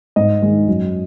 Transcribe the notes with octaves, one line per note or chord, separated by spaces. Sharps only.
G#2 D#5
D#3 G#3 D#4
F#2